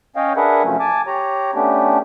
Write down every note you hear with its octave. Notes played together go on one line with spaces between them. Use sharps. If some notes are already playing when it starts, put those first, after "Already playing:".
C#4 C#5 D#5 F5 G5
D4 G#4 A#4 B4 E5 F#5
C3 F3 F#3 A3 C#4
G#5 A5 D6
G4 C#5 A#5
A3 B3 C#4 D4 G4